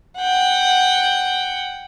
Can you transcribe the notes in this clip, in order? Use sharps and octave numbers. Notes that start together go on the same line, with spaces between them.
F#5 G5